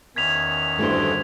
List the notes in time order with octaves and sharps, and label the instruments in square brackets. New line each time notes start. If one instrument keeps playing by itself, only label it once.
[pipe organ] E2 D#3 C#4 [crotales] G#6 B6 F7
[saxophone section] D2 G2 [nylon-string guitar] A3 E4 C5